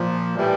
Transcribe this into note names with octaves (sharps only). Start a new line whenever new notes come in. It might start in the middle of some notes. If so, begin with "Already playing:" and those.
Already playing: A#2 F3
A2 E3 G3